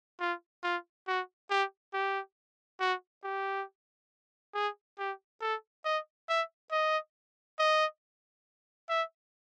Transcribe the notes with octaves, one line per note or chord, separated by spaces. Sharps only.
F4
F4
F#4
G4
G4
F#4
G4
G#4
G4
A4
D#5
E5
D#5
D#5
E5